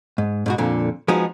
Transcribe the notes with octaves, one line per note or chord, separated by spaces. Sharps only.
G#2
G#2 B2 F#4
F2 A#2 D3
F3 G#3 B3 D#4 F#4 G#4